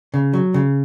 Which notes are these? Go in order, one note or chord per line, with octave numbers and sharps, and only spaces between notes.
C#3
F#3
C#3